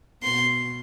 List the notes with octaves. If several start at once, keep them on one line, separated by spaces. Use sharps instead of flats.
B2 C6